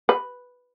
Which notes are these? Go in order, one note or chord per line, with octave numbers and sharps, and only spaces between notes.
B4